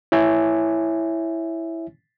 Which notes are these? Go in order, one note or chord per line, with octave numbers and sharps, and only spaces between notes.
E4 C#5 E5 G#5